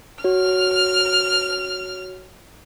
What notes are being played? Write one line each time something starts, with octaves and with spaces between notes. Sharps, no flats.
F#4 C#5 F6